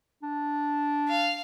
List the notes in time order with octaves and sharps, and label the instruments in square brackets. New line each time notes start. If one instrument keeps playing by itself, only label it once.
[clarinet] D4
[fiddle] F5